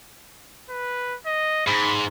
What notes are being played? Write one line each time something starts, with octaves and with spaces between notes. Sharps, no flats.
B4
D#5
G#2 B5